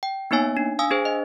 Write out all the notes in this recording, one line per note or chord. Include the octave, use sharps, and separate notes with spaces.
G5
A#3 B3 D#4 C#5 G#5
D4
F5 G#5 D#6 E6
D4 G#4 C5
D#5